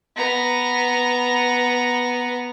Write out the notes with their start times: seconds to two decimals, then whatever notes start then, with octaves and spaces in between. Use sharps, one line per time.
0.16 B3 A#5